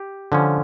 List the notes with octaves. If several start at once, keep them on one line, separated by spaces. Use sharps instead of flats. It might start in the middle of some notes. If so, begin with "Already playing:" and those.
Already playing: G4
D3 F3 C#4